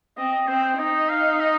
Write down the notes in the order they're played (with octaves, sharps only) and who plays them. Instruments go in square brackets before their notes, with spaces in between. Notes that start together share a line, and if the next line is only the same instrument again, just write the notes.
[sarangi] C4 [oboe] D#5
[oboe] D#5
[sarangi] C4 [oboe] C5
[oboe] C5
[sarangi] D#4 [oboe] D#5
[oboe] F5
F5
D#5